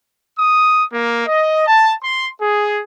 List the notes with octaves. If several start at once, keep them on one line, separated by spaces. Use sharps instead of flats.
D#6
A#3
D#5
A5
C6
G#4